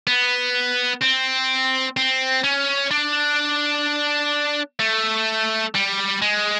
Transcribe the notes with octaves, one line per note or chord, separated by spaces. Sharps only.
B3
C4
C4
C#4
D4
A3
G3
G#3